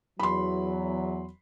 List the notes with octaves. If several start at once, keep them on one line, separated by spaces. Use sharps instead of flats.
E2 F#3 B5 C6